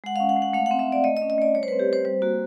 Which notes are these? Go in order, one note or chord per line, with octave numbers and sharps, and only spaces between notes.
G#3 F#5
C#4 F5
F#5
G#3
F#5
A3 F5
C4 F#5
E5
A3 D5
A3 D#5
D#5
C#4
D#5
A3 D5
G3 C#5
C5
C4 B4
G4
G3 C5
G3 C5
A#3 F#4